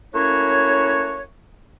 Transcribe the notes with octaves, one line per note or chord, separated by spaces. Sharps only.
A3 A#3 C#4 E4 F#4 C#5